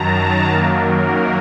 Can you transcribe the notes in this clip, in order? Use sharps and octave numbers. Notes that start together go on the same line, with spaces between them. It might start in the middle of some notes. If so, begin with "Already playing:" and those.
Already playing: F#2 D#3 F#3 A5 A#5
F#2 D#3 F#3 A#3 A#4